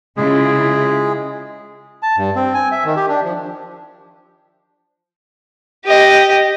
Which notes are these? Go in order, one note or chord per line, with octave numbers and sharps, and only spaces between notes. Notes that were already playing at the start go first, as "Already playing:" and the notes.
C#3 G#3 E4 F4 G#4
A5
G2
C4
G#5
E5
D#3
G4
D4
F3
G4 D#5